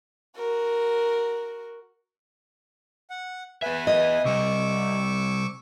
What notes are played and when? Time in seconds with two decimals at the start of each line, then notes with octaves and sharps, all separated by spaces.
0.36 F#4 A#4
3.10 F#5
3.62 B3 B4 E5 G#5
3.87 D#5
4.25 C3 G3 C#6 D6 E6